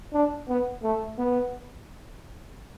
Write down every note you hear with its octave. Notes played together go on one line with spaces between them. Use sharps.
D4
B3
A3
B3